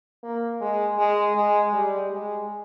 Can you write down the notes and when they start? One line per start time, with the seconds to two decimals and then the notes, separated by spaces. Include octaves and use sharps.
0.24 A#3
0.61 G#3
0.98 G#3
1.36 G#3
1.73 G3
2.10 G#3